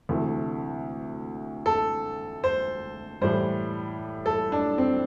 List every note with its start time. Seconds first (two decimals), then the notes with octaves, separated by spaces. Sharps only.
0.09 D2 C3 E3 A3
1.66 A4
2.44 C5
3.21 A2 E3 G3 C5
4.26 A4
4.52 D4
4.78 C4